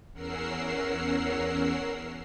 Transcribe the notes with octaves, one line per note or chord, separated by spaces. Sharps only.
E2 C#4 A#4 F#5 E6 C7